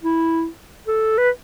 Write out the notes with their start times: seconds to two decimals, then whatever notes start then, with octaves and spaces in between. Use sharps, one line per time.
0.03 E4
0.87 A4
1.18 B4